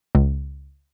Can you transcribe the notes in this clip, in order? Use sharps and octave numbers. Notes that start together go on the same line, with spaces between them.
C#2